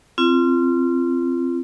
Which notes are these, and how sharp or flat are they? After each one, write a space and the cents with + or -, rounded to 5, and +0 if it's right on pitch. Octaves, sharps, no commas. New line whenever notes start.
C4 +0 F4 -30